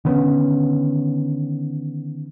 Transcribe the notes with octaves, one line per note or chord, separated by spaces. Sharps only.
D3 D#3 B3 C#4